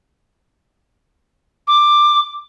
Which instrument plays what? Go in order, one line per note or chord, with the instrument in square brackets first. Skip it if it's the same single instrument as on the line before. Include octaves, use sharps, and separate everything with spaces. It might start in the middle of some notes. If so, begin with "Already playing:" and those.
[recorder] D6